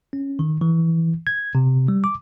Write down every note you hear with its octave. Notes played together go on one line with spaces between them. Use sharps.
C#4
D#3
E3
G#6
C3
G3
D6